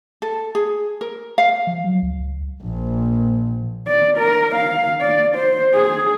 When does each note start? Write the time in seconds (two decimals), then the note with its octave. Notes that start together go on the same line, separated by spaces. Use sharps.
0.22 A4
0.55 G#4
1.01 A#4
1.38 F5
1.67 F3
1.84 F#3
2.03 C#2
2.20 C#2
2.64 A#1
3.87 D5
4.18 A#4
4.55 F5
5.01 D5
5.35 C5
5.74 G#4